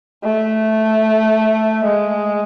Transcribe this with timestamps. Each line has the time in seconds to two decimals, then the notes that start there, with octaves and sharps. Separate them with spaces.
0.24 A3
1.85 G#3